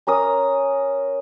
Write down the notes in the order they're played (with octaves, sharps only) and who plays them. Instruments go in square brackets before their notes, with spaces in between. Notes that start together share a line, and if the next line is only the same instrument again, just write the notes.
[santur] C#4 A#4 A#5 D#6